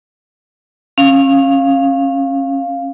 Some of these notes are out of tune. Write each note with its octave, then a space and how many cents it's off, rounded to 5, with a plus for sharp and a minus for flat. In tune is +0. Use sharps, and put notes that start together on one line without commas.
C#4 -30 F5 +0